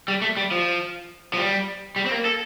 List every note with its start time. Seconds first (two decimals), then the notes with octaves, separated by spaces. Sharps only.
0.08 G3
0.22 A3
0.37 G3
0.51 F3
1.34 F3
1.38 G3
1.96 G3
2.06 C4
2.11 A#3
2.25 A4